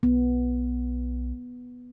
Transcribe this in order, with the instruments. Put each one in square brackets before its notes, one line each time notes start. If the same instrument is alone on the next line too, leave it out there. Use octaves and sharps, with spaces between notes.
[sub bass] B1 [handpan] B3